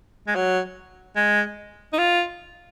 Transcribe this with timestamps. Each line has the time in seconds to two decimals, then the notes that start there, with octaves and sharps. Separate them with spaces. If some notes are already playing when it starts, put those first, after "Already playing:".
0.28 G#3
0.35 F#3
1.17 G#3
1.93 D#4
1.98 F4